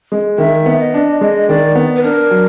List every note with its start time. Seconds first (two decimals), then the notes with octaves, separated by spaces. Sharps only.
0.12 G#3
0.38 D#3 E5
0.66 B3
0.79 D#5
0.94 D4
1.21 G#3 D#5
1.48 D#3 D5
1.75 B3
1.96 B4
2.03 D4 A#4
2.31 F#3